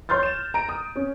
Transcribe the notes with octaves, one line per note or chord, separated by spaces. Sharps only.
C#5 C6 F6 G6 A6
E7
A#5 D7
D#6
C#4